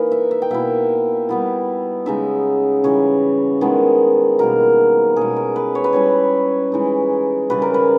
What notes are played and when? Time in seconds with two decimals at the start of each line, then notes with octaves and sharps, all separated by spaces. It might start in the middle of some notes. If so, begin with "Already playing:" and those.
Already playing: E3 A#3 D#4 B4
0.12 E5
0.31 E5
0.42 G5
0.51 B2 A#3 E4 E5
1.29 G3 B3 E4
2.06 C#3 G#3 D#4 E5
2.84 C#3 E3 G3 C#5
3.61 D#3 G#3 B3 E4
4.39 B2 G3 A#3 A#4
5.16 B2 G#3 C#4 G#4
5.36 A#4
5.56 B4
5.75 C#5
5.84 B4
5.93 G3 C#4 E4 C#5
6.72 E3 G#3 D#4
7.50 C#3 G3 C#4 B4
7.62 A#4
7.74 B4